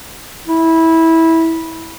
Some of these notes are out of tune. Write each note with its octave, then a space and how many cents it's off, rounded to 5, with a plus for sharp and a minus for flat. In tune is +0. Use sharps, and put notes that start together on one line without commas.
E4 -15